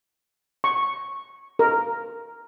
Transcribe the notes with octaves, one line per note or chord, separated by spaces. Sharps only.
C#6
A#4